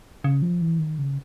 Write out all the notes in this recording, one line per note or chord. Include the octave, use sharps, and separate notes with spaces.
C#3
F3
E3
D#3
C#3